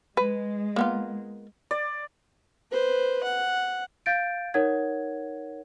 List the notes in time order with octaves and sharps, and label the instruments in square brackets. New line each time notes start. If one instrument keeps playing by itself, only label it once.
[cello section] G#3 [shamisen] B4
[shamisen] A#3 B3 F4
[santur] D5
[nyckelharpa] B4 C5
F#5
[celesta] F5 G6 A6 D7
D#4 A#4 C#5 F#5 G#6